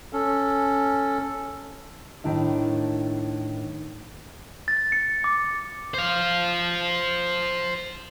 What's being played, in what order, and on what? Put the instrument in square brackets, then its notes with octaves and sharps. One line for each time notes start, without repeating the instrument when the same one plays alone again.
[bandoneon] C#4 A4
[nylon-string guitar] A2 D#3 D4 E4 E5
[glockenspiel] A6
C#7
D6
[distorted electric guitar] C5 F5